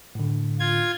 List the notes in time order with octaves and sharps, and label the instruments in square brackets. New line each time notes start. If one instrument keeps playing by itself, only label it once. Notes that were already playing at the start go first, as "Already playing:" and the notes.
[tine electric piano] A2 D3
[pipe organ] F4 G#6